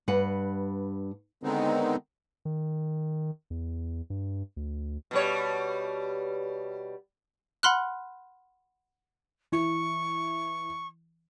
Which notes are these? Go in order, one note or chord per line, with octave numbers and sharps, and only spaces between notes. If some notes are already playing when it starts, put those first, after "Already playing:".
G2 B4 F#5
D3 D#3 G#3 B3 C4 D#4
D#3
E2
G2
D2
B2 G3 C#5
F#5 B5 C6 F6 F#6
E3 C#6